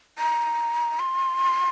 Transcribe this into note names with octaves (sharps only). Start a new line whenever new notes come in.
A#5
C6